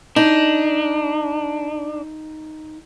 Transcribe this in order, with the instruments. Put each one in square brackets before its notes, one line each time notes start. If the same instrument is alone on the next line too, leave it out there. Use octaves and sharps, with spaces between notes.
[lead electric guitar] D4 [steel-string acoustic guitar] D#4